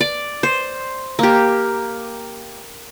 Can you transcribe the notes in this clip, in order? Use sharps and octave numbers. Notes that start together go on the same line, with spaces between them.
D5
C5
A#3 G4